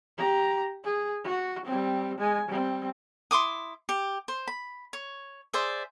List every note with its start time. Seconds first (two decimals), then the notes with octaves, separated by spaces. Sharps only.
0.18 G4 A#5
0.84 G#4
1.24 F#4
1.65 G3 C4
2.18 G#3 G#5
2.48 G3 C4
3.31 E4 C6 D6 D#6
3.89 G4
4.28 C5
4.47 B5
4.93 C#5
5.53 G#4 C5 D5 E5